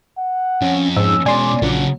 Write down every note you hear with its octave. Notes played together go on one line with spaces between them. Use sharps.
F#5
F2 C#4
G#2 C#4 E6
B2 G#3 D5 G#5 C6
A#1 C#3 F#3 F#5